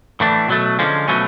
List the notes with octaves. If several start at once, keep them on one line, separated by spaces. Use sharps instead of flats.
A2 E3 A3 D4
B2 F#3 A3
D3 F3 G#3 C#4
B2 F#3 A3 C#4